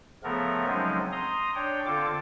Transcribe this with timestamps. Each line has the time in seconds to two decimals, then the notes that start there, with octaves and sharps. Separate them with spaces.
0.23 C#3 F3 A3 B3 A#4
0.67 F3 F#3 G#3 C4 C#4 D#4
1.12 A#5 C6 D#6
1.55 D4 C#5 G5
1.86 D3 C4 F4 A4 D6